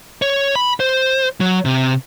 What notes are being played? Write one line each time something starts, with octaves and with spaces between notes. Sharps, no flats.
C#5
B5
C5
F#3
C3